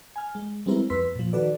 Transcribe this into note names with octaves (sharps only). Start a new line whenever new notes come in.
G#5 F6
G#3
G3 G#3 B3 C4 E4 A#4
F2 B4 C6 E6 B6
A#2 F3
D#3 F#4 A4 B4 D5